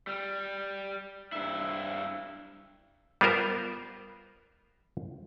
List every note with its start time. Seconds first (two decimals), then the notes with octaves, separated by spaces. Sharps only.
0.07 G3
1.32 G2 E4
3.21 G3 B3 F4 A#4 C5